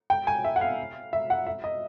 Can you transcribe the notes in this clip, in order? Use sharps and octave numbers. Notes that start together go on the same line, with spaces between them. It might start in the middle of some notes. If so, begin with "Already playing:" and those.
G5
G#5
E5
F#5
F5
E5
F#5
E5
D#5